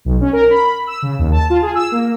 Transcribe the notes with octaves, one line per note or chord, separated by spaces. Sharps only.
B1
C#4
A#4
B5
E6
C#3
D#2
A5
F4
G#4
E6
A#3